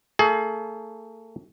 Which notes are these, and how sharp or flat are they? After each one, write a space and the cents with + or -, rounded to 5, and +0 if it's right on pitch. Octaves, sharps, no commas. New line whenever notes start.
A3 +40 G#4 +35